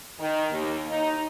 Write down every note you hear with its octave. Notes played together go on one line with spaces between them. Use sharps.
D#3
D#2
D#4